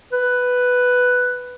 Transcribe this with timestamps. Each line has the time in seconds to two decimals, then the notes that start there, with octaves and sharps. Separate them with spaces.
0.13 B4